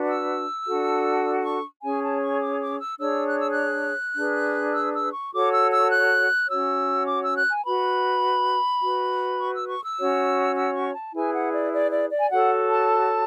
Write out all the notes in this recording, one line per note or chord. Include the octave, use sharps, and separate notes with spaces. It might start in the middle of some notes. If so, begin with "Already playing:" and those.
Already playing: D4 F#4 B4
E6
D4 F#4 A4
C#6
C#4 G#4 C#5 G#5
A5
C#6
D6
D6
E6
D4 G#4 C#5 E6
F#6
E6
F#6
D4 G#4 B4
E6
E6
C#6
F#4 A4 C#5 D6
E6
E6
F#6
C#4 F#4 C#5 E6
D6
E6
F#6
G#5
F#4 B4 B5
F#4 B4
C#6
E6
C#6
E6
C#4 F#4 C#5
E6
C#6
A5
E4 G#4 B4 G#5
F#5
D5
D5
D5
D5
G#5
F#4 A4 C#5 F#5
A5